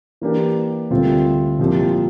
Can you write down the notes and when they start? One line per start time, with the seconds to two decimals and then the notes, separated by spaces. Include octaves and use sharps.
0.21 E3 A#3 D4 G4
0.90 D2 C3 G3 C4 F4
1.59 C2 A#2 F3 C4 G4